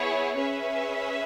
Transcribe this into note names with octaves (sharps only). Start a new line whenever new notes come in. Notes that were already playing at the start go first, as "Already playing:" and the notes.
Already playing: B3 E4 G#4 C#5
C#4 G#4 B4 E5